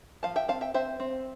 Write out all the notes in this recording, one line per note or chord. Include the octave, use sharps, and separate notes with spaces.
F3 F5 A5
E5 G5
C4 F5 A5
E5 G5
C4 C5 E5
C4